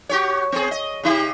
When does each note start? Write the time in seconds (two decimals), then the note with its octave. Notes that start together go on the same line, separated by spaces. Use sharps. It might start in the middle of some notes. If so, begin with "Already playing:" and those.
0.09 F#4 G4 C#5
0.52 B3 G#4
0.71 D#5
1.03 C#3 D#4 G4